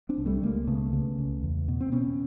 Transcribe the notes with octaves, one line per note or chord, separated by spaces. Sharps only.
C4 D4
C2
G3 A3
C#2 G#3 A#3
C#3 A3 B3
C#3
C#2
E2
B2
C4
B2 B3 C#4